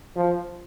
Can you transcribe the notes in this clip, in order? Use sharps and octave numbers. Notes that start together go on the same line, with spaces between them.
F3